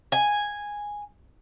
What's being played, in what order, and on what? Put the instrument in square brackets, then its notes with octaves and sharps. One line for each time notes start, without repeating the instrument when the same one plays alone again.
[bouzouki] G#5